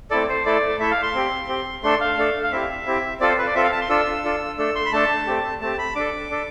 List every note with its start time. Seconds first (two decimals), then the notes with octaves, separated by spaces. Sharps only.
0.11 A3 C4 E4 A4 D5
0.28 C5
0.45 A3 E4 A4 D5
0.80 A3 E4 A4 E5
0.91 F5
1.03 C6
1.14 C4 G4
1.49 C4 G4
1.83 A3 D4 A4 C6
2.01 F5
2.18 A3 D4 A4
2.43 F5
2.52 C4 E4 G4 E5
2.86 C4 E4 G4
3.20 C4 F4 A4 D5
3.29 C5
3.38 B4
3.47 D5
3.55 C4 F4 A4 E5
3.63 F5
3.72 A5
3.81 C6
3.89 D4 F4 A4 E6
4.24 D4 F4 A4
4.58 A3 D4 A4 E6
4.75 C6
4.85 B5
4.92 A3 D4 A4 A5
5.27 A3 C4 G4
5.61 A3 C4 G4 A5
5.78 B5
5.96 D4 A4 D6
6.30 D4 A4